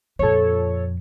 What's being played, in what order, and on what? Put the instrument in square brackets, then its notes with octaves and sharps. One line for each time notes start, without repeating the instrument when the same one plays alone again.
[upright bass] F2 A#2 [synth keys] A4 C#5